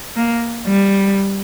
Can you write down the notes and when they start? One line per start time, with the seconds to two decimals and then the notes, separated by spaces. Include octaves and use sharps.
0.17 A#3
0.66 G3